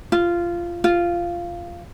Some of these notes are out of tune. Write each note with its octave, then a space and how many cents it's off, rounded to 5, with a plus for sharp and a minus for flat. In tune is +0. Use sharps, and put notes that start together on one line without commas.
F4 -15
F4 -10